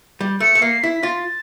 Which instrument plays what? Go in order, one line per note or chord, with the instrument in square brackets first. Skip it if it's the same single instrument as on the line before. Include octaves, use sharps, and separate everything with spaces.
[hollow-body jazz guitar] G3
[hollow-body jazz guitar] A3 [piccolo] C#7
[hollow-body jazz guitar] A3
[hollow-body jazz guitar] A#3 [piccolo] C7
[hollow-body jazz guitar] E4 [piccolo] B6
[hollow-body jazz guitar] F4 [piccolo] A6